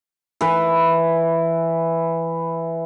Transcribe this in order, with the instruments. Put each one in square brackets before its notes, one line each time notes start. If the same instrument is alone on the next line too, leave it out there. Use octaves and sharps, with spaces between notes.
[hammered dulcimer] E3 B4